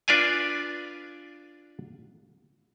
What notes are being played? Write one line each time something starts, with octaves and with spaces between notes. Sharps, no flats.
D4 F4 B4 D5 F5 G#5